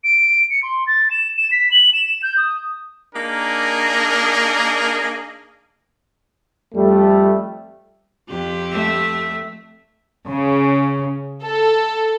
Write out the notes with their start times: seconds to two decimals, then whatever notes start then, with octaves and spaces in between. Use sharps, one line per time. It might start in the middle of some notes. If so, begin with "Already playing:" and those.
0.04 D7
0.50 C#7
0.63 C6
0.87 A6
1.11 E7
1.37 E7
1.52 B6
1.71 F#7
1.93 E7
2.23 G6
2.37 D#6
3.15 A#3 D4 D#4 G#4 A#4
6.75 F2 G3 A3
8.29 F2 G4
8.71 A3 E5
10.29 C#3
11.43 A4